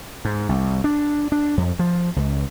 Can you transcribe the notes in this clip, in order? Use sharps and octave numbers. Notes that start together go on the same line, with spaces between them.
G#2
C2
D4
D4
F2
F3
C#2